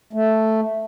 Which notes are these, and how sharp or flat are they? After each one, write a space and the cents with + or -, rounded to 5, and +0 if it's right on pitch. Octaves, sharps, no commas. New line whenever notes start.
A3 +0